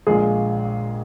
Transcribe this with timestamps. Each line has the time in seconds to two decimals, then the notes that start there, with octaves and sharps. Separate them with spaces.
0.07 A#1 A#2 G#3 F4 G#4